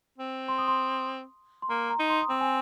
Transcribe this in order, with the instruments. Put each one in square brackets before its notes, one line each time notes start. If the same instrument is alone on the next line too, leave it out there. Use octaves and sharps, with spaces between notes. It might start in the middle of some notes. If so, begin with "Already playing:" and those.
[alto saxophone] C4
[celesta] C6
D#6
C6
C6
[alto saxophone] A#3 [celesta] A#5
[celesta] A#5
[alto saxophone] D#4
[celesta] C6
D#6
[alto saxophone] C4 [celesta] C6
[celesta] G#5